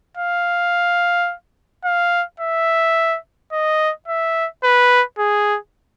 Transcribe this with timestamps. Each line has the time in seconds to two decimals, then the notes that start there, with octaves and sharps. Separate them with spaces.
0.17 F5
1.85 F5
2.40 E5
3.53 D#5
4.08 E5
4.64 B4
5.18 G#4